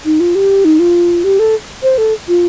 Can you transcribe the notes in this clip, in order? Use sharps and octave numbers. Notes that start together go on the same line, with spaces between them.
D#4
F4
G4
D#4
F4
G4
A4
C5
A4
F4